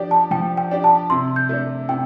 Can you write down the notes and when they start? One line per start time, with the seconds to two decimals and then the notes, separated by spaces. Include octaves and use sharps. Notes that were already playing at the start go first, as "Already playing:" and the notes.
Already playing: F3 D4 G4 D5
0.11 A5
0.31 F3 G5
0.57 G5
0.71 D4 G4 D5
0.84 A5
1.10 C3 C6
1.36 G6
1.49 A3 D4
1.89 C3 G5